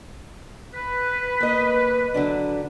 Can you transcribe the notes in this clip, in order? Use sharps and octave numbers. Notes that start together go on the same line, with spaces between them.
B4
A#3 D#5
D3 F#3 D4